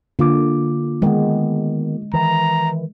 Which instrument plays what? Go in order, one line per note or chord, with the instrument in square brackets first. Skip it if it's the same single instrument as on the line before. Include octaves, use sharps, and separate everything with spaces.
[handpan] D3 [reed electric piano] A#3 F4 D6
[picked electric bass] D#3 B3 [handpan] G#3
[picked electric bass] D#3 E3 [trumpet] A#5